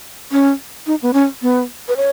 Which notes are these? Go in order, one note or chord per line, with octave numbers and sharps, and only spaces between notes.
C#4
D#4
B3
C#4
B3
B4
C#5